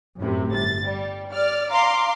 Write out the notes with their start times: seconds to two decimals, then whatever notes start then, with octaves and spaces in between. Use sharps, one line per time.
0.18 F#2 A2 C3
0.51 G1 A6
0.83 G3
1.32 D5 F6
1.70 F5 A#5 C6 D6